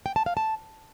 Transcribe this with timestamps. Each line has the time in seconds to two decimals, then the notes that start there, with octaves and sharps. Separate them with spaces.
0.06 G5
0.16 A5
0.26 F5
0.37 A5